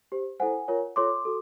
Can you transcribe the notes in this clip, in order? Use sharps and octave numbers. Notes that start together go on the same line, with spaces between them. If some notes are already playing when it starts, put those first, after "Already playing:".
G4 C5
E4 A4 C5 F#5 G#5
F4 A#4 C#5
F4 A4 C#5 C6 D6
F#4 A4